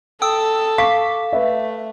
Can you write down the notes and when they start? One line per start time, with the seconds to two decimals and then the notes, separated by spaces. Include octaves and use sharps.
0.22 A4 G5 D#6 E6
0.78 F5 C#6 D6 B6
1.33 A3 B4 E5